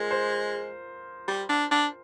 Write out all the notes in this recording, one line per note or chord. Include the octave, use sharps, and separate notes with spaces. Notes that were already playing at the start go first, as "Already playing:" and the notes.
Already playing: G#3 F4 G#4 A#4 C5
C5
G3
D4
D4